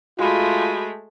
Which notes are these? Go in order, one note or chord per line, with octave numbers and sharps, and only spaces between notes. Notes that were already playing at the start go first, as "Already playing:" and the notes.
G#3 A3 F4 F#4 B5